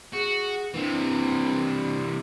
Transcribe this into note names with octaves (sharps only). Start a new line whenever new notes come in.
F#4 G#4
C3 E3 A#3 C4 D4